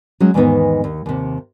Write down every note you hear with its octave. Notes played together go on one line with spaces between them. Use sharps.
F#3 G#3 C#4
E2 G#2 D#3 G#3 B3 D#4
D#2
D#2 C3